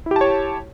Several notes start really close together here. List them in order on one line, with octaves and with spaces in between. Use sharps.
E4 G4 A5 C#5